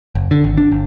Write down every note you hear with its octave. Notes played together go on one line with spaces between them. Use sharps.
F#1
D3
G#1
D4
G1